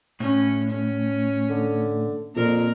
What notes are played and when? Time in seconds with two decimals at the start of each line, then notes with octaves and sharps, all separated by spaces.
0.20 A2 C#4
0.69 C#4
1.49 D3
2.36 F2 A#2 A#4